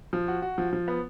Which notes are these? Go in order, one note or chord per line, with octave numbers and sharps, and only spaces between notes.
F3
F#4
F#4
F3
F3
B3